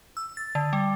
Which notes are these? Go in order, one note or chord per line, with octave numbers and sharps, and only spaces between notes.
E6
A6
D3
G3